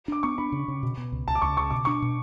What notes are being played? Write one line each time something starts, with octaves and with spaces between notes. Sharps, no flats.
D4 D6
B3 C#6
D4 B5
C#3
C#3
B2
B2
C#2
C#2 A5
D6
C#2 C#6
C#3 C#6
B2 D6
D4 C#6
B2